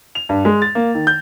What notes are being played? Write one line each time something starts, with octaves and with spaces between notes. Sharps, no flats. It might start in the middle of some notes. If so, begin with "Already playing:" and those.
F7
G2
G#3
A6
A#3
D#3
G6